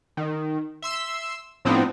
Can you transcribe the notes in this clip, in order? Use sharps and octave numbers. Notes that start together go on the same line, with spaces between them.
D#3
E5 C6 E6
A2 F3 B3 C4 D4 D#4